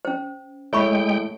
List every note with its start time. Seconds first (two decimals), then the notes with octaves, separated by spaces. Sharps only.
0.05 C#4 C5
0.73 G#3 A3 E4 C#5 G5 B5 C#6